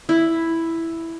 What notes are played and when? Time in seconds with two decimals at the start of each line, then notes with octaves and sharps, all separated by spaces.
0.09 E4